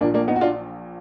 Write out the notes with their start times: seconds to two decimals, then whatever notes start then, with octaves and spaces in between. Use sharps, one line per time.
0.01 A#1 A#2 A#3 D4
0.14 A#3 D4
0.28 B3 D#4
0.36 F#4
0.41 D4 F4